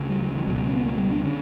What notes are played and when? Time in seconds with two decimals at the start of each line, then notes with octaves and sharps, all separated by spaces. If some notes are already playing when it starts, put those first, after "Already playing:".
Already playing: D2 C#3
0.09 G3
0.23 F#3
0.36 E3
0.47 C#2 B2 F#3
0.57 G3
0.67 C#4
0.76 B3
0.86 A#3
0.98 G3
1.11 D4
1.24 D3 C#4